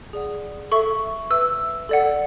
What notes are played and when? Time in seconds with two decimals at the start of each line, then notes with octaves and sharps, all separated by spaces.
0.13 G#4 D5 F#5
0.71 A4 E5 C#6
1.30 B4 E5 E6
1.89 A4 D5 F#5